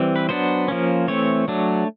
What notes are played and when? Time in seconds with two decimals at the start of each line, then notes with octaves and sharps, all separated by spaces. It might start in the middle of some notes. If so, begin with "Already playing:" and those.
Already playing: E3 G3 C4
0.16 B4
0.29 F#3 B3 D4 C5
0.68 F3 A#3 C#4
1.08 E3 A3 C4 C#5
1.48 F#3 A3 D4